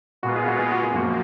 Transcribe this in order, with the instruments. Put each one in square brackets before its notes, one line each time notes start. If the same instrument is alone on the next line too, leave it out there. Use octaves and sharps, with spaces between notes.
[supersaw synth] A#2 G#3 B3 F4 [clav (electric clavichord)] F#4
[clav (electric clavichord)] G#4
F#4
G#4
F#4
G#4
[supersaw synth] F#2 F3 A#3 [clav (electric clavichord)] F#4